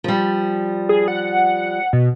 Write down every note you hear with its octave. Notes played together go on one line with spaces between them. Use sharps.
F3 G3
G#4
F#5
B2